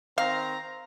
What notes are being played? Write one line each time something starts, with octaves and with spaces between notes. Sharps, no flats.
D#3 C4 F5 A#5